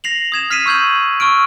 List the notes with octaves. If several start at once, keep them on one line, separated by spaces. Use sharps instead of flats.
A#6 C7 F7 F#7
D#6 G#6 E7
F6 B6 C7 D#7 E7
C#6 E6 G6 G#6 F#7
C#6 E6 F6 D7